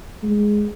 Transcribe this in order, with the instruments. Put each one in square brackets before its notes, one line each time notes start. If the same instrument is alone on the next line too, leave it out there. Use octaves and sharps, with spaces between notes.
[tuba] G#3